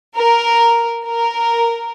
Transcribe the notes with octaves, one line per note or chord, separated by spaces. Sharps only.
A#4
A#4